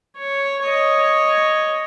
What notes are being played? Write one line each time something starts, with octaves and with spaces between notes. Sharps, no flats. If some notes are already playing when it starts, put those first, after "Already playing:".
C#5
C#5 D#5